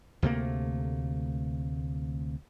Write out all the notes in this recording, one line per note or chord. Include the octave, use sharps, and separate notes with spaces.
D2 C3 A3 A#3